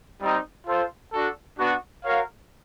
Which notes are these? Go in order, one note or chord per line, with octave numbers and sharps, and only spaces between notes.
G3 C4 D#4
F4 A4 C5
D4 F#4 A4
B3 D4 F#4
F#4 A#4 C#5 F5